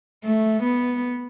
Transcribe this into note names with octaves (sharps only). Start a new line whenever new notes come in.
A3
B3